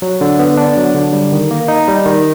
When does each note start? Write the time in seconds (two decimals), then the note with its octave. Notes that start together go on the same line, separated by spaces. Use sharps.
0.02 F#3
0.21 D3
0.39 B3
0.57 D4
0.77 F#3
0.94 D3
1.13 G3
1.32 D#3
1.51 A#3
1.68 D#4
1.88 G3
2.06 D#3